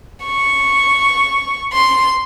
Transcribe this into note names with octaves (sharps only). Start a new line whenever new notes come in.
C#6
C6